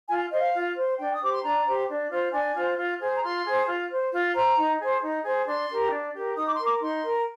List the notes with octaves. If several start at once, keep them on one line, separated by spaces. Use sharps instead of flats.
F4 G#5
C5 D#5
F5
F4
C5
D4 G5
D#6
G4 C5 D6
C6
D4 A#5
G4 C5
D4
F4 C5
D4 G#5
F4 C5
F4
G#4 C5
A#5
F4 C6
G#4 C5
F4
C5
F4
C5 A#5
D#4
G#4 C5
D#4
G#4 C5
D4 C6
G4 A#4
D4
G4 A#4
D#4 D#6
D6
C6
A#4
D6
D#4 C6
A#4